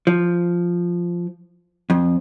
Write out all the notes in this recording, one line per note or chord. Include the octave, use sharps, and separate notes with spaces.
F3
F2